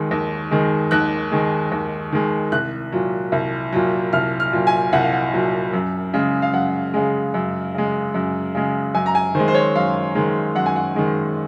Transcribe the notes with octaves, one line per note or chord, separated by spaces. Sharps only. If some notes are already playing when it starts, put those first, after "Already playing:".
Already playing: D#2 D#3 G#3
D#2
D#3 G#3
D#2 F#6
D#3 G#3
D#2
D#3 G#3
C2 F#6
A#2 F#3
C2
A#2 F#3
C2 F6
F6
A#2 F#3
G#5
C2 F#5
F5
F#5
A#2 F#3
F#2
C#3 G#3
F5
F#2 F#5
C#3 G#3
F#2
C#3 G#3
F#2
C#3 G#3
F#2 G#5
A#5
G#5
D#3 G#3 C5
C5
C#5
F#2 F5
D#3 G#3
F#2 F#5
G#5
F#5
D#3 G#3